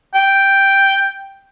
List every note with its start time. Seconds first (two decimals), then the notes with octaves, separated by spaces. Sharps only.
0.15 G5